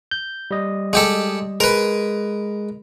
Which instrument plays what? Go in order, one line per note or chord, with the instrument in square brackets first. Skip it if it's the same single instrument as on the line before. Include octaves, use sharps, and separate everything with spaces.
[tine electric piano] G6
G3 D#5
[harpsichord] G#3 G4 A4
[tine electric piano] G#3 [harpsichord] A#4 B4